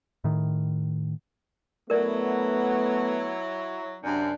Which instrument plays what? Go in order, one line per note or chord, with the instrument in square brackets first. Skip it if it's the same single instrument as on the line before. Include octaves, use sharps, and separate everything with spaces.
[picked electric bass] A2 D#3
[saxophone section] F#3 E4 [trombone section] A3 B3 [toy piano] A#4 D5
[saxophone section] F#2 C3 [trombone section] D4